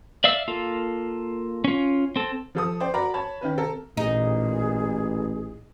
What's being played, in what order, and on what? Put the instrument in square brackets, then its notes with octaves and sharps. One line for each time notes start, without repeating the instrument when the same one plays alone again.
[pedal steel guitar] D5 E5 F5 E6
A#3 F4 A4
C#4 F4
C4 A4
[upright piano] F3 A4 D#6
C5 D5 G5
F#4 A#4 D5 A#5 B5
C#5 A5 B5
D#3 C#4 B4
C3 A4 A#4
[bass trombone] A1 [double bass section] A#2 [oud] D#4 [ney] G#4